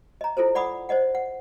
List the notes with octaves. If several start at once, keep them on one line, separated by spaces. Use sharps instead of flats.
D#5 A#5
E4 F4 A4 A#4 C5
D5 F#5 B5 D6 D#6
C5 D5 D#5 F#5
F#5